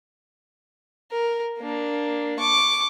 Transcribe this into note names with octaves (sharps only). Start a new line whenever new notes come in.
A#4
A#3 D4
C#6 D6